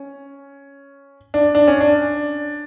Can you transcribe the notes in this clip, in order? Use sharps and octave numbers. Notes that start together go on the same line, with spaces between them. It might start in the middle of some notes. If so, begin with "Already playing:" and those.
Already playing: C#4
D4
D4
C#4
D4